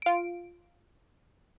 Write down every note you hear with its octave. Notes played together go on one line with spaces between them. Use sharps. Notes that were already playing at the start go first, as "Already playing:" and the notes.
F4 D7